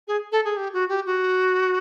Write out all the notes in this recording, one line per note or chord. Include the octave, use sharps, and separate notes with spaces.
G#4
A4
G#4
G4
F#4
G4
F#4